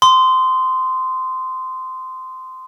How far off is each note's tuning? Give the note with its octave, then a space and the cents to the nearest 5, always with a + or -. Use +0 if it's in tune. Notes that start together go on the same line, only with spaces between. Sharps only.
C6 -15 D#6 -20